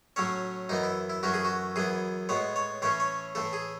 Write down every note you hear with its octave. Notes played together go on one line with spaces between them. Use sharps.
A2 F#3 A3 C#4 C#5
F#2 E3 B3 D#4
E4
E4
F#2 E3 A3 C#4 F#4
G#4
F#4
F#2 E3 B3 G#4
A2 G#3 B3 C#5
C#5
A2 E3 A3 C#4 C#5
C#5
A2 E3 A3 A4
G#4